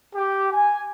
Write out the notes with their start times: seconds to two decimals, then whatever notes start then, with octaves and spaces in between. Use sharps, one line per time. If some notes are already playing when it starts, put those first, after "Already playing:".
0.14 G4
0.53 G#5